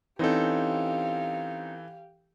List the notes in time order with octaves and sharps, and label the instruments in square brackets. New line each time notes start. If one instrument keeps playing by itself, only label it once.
[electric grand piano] E3 A4 [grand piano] C4 C#4 D#4 [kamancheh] G4 F5